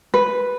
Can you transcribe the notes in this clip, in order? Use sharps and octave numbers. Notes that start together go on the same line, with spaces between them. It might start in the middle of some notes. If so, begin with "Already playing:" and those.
B4